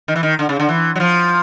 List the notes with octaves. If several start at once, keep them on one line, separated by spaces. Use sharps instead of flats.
D#3
E3
D#3
D3
C#3
D3
E3
F#3
F3